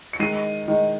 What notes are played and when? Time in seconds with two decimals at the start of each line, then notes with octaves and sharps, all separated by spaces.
0.13 C#7
0.19 D#3 G#3 C7 D#7
0.68 D#3 G#3